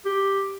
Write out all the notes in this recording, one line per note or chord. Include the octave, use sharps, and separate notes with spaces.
G4